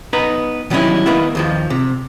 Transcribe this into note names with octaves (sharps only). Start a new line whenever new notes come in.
B3 D#4 B4 A#5
D#3 F#3 G3 C#4 D#4 E4
D#3 A#3 B3 E4
D#2 D#3 F3
C3